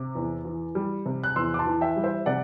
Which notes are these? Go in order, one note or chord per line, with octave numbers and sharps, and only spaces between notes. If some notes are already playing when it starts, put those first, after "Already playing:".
Already playing: C3 D6
E2
E3
G3
C3
F#6
E2 C6 E6
D6
A5 C6
E3
E5 G5
G3
C5 E5
C3 D5 F#5